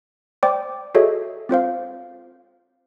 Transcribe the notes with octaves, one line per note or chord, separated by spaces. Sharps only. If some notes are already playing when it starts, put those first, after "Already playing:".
C5 D5 G5 D6
F#4 G#4 A4 C#5 D#5 E5
C4 F4 C5 F5